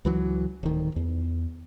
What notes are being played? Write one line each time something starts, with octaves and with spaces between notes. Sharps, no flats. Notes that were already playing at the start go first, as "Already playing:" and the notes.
C#2 E3 F#3
D1 D#3
E2